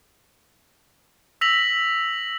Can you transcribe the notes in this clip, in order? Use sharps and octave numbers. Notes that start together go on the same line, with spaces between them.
E6 A#6 B6 F7 F#7